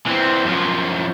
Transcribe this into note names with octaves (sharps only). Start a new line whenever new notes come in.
E3 C4
F#2 F3